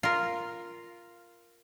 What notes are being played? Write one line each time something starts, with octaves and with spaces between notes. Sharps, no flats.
F4 A#4